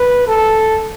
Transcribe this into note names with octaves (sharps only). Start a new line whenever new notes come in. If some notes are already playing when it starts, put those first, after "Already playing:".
Already playing: B4
A4